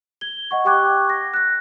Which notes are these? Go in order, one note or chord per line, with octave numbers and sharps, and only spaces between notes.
G#6 G7
D#5 F#5 C#6
G4 G5 C#6 D6 F#6 G#6
A#6
F#6 A#6